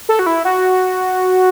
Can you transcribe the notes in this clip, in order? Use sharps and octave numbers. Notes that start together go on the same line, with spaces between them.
A4
F#4
E4
F#4